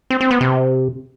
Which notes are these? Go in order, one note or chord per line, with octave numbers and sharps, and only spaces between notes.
C4
C4
B3
C3